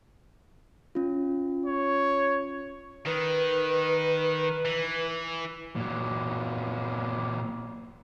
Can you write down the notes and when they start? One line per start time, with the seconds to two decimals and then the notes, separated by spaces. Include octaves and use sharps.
0.95 C#4 F4
1.66 C#5
3.06 D#3 B4
4.65 E3
5.76 A#2 F#3